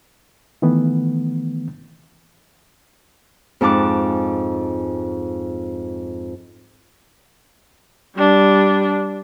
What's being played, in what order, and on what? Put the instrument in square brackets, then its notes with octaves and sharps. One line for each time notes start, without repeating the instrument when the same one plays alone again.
[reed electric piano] D#3 E3 A3 B3
[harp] F2 G#2 A5 D6 F#6
[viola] G3 D4